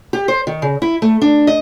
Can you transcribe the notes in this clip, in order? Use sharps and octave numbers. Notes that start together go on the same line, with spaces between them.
G4
C5
D#3
C#3
E4
A3
D4
D#5